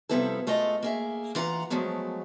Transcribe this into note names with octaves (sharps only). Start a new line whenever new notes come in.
C3 F3 G3 B3 E4 A4
G#2 A3 F4 A4 D#5
A#3 G#4 E5
E3 F4 F#5 A#5
F3 F#3 G#3 A3 B3